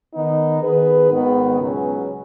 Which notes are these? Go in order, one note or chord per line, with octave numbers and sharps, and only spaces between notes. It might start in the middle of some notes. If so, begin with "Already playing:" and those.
D#3 B3 D#4
D#3 B3 G#4 B4
G#1 G#2 D#3 B3
C#2 B2 F#3 C#4 G#4